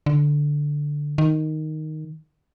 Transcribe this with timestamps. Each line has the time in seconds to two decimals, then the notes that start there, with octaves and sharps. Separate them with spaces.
0.06 D3
1.18 D#3